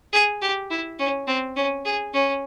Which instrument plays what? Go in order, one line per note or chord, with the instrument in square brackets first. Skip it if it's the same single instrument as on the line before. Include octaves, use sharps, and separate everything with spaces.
[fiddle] G#4
G4
E4
C#4
C4
C#4
G#4
C#4